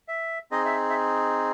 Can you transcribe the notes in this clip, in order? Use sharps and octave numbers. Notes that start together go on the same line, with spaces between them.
E5
C4 D#4 G#4 D#5
E5
E5